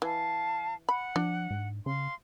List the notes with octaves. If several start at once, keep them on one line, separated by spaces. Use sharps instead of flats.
E3 F5 A5
F#5 B5
F3 D4
G#2
C#3 F5 C6